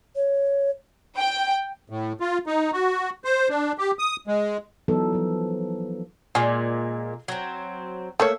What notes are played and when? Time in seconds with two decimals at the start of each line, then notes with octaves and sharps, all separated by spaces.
0.16 C#5
1.17 G5
1.90 A2
2.20 F4
2.47 D#4
2.73 F#4
3.25 C5
3.49 D4
3.78 G4
3.99 D#6
4.27 G#3
4.88 E3 F#3 B3 D#4 A4
5.13 F3 F#3
6.35 A#2 G#3 F4 G#4
7.28 F#3 C4
8.20 A3 A#3 C#5 E5